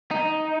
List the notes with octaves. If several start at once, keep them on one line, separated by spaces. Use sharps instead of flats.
D#4